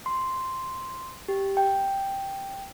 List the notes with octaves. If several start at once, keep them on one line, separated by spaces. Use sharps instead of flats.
C6
G4
G5